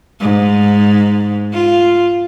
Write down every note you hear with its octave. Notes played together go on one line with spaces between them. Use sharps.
G#2
F4